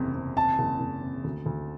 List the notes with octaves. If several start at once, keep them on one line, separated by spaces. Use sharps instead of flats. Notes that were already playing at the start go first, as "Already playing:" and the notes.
Already playing: F#1 E2 C3
C3
C3 A5
F#1
F#1
C3
D2
D2